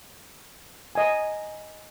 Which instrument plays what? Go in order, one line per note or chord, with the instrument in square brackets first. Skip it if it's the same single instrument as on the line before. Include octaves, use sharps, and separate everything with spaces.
[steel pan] D#5 G#5